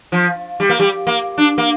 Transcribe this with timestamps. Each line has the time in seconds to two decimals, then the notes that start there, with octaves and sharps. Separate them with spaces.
0.12 F3
0.60 G3
0.69 A#3
0.80 G3
1.07 A#3
1.38 D4
1.58 A#3